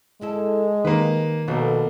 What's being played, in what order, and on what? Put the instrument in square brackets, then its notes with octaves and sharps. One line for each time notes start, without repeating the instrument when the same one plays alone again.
[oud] D3 E4 A4 [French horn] G#3
[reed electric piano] D#3 [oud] G3 [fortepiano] A#3 B4
[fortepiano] A#1 [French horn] B2 [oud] A4 C5 C#5